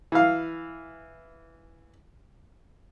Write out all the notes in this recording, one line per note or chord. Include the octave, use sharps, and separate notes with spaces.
E3 F5